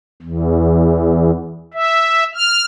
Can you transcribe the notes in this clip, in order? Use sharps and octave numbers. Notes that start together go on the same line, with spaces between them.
E2
E5
F6